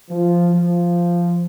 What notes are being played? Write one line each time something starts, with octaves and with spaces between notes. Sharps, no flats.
F3
F3